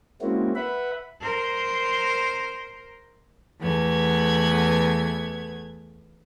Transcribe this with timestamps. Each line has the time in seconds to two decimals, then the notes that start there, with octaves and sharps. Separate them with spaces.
0.21 G#3 A#3 C4 C#4 E4 F#4
0.55 B4 E5 F#5 B5
1.21 A#4 C5
3.60 E2 A3 B3 G#6